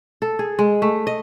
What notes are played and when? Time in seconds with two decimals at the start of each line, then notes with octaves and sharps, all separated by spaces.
0.22 A4
0.39 G#4
0.59 G#3
0.82 A3
1.07 D#5